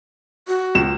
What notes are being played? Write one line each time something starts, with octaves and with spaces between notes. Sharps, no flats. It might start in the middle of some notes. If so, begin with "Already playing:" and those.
F#4
C#2 E7